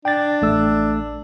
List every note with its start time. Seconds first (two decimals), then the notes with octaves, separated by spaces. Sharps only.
0.05 D4 G5 A6
0.42 A1 A3 E6